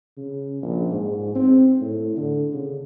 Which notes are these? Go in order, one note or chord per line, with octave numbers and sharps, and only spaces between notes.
C#3
A#1
G#2
C4
A2
D3
C#3